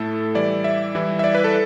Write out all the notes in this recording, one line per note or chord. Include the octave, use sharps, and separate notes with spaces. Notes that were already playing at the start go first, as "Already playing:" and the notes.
Already playing: A2 A3 E4 A4
E3 G3 E4 D5
E5
E3 G3 E4
E5
D5
B4
A4